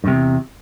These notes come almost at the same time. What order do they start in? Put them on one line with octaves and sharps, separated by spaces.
G2 C3 E2